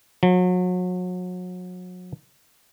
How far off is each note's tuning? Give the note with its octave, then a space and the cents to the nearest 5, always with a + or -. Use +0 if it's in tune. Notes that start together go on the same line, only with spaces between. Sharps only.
F#3 -35